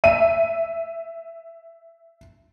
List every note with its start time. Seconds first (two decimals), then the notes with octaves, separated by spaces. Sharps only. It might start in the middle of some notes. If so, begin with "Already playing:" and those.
0.04 E5 D#7